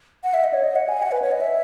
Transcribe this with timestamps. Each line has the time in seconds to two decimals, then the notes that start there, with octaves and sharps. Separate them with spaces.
0.23 F#5
0.34 E5
0.44 D#5
0.53 C#5
0.64 D#5
0.76 F#5
0.89 G#5
1.02 F#5
1.12 B4
1.22 C#5
1.31 D#5
1.41 E5